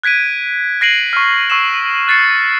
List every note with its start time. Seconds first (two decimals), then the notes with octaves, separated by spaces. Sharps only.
0.03 F#6 G#6 B6 D7 D#7
0.81 F#6 A#6 C7 D7 D#7 F#7
1.13 C#6 F6
1.50 C#6 E6 C7 E7
2.08 F#6 A6 C7 C#7